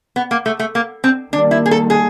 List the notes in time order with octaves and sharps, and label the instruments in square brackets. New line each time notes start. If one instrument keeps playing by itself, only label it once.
[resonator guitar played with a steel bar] B3
A#3
A3
A3
A#3
C4
[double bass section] D#3 G3 A#3 [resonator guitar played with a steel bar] D4
[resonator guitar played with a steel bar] E4
G#4
A4
G#4